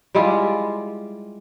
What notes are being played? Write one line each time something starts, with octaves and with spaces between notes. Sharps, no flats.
G3 G#3 E4 F4